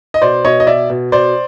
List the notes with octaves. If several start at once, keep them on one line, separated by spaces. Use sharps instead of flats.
D#5
B2 C5 D5
B2 C#5 D#5
D#5
B2 D5 E5
B2
B2 C5 D5